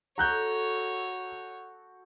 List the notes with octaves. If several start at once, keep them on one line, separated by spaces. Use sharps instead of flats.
F#4 A4 C#5 A#5 F#6 G6